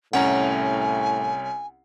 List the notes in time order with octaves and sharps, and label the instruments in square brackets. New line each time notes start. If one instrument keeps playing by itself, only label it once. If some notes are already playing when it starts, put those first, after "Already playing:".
[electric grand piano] C2 C#4 A#5 [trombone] A2 [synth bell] F#5 [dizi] G#5